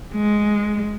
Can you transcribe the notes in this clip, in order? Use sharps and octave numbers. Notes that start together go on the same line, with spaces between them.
G#3